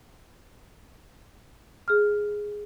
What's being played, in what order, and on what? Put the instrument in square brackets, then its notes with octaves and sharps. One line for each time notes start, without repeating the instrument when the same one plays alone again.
[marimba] G#4 F6